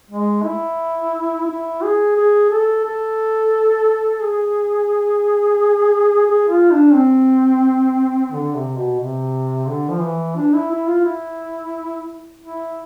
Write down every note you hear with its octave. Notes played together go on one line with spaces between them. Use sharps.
G#3
E4
E4
G#4
G#4
A4
A4
G#4
G#4
F4
D4
C4
D3
C3
B2
C3
D3
F3
E3
D4
E4
E4
F4
E4
E4